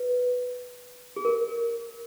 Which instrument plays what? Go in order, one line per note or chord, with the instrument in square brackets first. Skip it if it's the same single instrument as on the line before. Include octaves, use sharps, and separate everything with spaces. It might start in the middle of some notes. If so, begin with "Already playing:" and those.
Already playing: [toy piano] B4
G#4
A#4